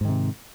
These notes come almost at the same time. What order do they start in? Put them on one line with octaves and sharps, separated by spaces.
G#2 D#3 C3